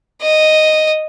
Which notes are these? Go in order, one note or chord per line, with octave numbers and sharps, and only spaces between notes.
D#5